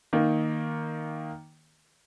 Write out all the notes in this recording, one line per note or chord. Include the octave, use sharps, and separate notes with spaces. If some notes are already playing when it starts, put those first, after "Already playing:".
D#3 A#3